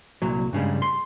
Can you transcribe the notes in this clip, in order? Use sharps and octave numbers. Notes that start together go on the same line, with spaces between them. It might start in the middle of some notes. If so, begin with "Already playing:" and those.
C2 A#2 F#3
G2 C#3 G3 G#3
C6